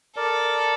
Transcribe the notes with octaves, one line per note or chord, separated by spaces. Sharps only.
A4 A#4 D5